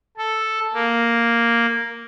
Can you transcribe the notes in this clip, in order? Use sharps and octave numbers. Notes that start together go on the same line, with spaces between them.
A4
A#3